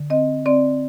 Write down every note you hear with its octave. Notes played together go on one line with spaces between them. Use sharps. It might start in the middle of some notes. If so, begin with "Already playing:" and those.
Already playing: D3
C4 D#5
C4 D5